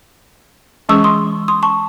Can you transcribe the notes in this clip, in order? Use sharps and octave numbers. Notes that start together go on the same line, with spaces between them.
E3 G#3 C#4 G#4 C#6 E6
C6 D#6
C6 D#6
A5 C#6